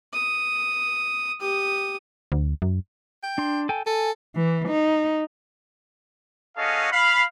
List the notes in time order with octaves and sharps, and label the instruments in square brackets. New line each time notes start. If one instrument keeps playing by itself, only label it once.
[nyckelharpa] D#6
G4 D#6
[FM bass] D2
F#2
[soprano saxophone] G5
[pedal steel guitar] D4 C6
A4 G5 G#5
[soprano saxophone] A4 [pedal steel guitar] G#5
[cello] E3
D#4
[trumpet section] C#4 F#4 G#4 A4 D#5 F5
F5 B5